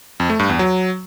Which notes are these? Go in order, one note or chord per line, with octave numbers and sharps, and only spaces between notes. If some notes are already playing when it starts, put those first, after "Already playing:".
F2
A3
G2
E2
F#3